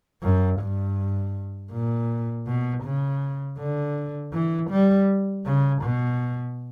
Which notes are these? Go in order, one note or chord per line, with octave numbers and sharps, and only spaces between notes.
F#2
G2
A#2
B2
C#3
D3
E3
G3
C#3
B2